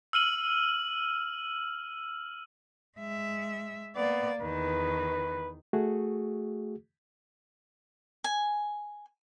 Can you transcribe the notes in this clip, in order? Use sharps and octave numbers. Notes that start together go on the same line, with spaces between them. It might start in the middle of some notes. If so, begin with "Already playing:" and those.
E6 F6 D#7 F#7
G#3 E5
A#3 B3 D5
E2 D#3 B4
A3 F#4 G#4
G#5